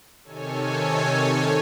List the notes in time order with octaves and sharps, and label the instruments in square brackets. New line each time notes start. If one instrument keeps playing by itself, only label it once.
[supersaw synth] C3 D#3 A4 C#5 G#5